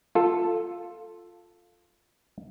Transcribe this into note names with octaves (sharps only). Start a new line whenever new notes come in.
F4 A4